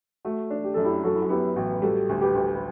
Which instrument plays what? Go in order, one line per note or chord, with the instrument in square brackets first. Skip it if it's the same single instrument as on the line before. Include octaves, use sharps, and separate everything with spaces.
[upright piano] A3 [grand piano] F#4
[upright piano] D4
[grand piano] G4
[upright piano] F#2 [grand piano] A4
[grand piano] E4 G4
[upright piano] F#3 [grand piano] F#4 A4
[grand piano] E4
F#4
[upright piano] B3 [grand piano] E4 G4
[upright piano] A1 [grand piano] F#4
[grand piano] B4
[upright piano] G3 [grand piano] F#4 A4
[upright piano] D2
[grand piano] G4 B4
[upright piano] D2
[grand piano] B4